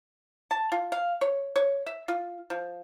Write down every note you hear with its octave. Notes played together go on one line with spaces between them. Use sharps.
A5
F4
F5
C#5
C#5
E5
F4
F3